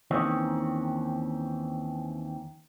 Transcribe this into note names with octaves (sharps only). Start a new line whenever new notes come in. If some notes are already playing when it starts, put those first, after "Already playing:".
D#2 D#3 E3 C4 C#4